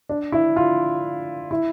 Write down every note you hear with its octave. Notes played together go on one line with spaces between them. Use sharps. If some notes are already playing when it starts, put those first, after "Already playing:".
D4
E4
F4
E4